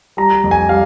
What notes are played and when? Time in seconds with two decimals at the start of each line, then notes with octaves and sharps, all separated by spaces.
0.17 G3 A#5
0.44 F2
0.51 G#5
0.69 G3 F5